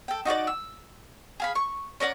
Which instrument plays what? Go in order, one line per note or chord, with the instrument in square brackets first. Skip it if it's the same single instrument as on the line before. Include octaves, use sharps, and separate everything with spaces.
[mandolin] A4 G5
D#4 F#4 C5 D5
E6
G#4 F5 B5
C#6
C#4 A#4 D5 F#5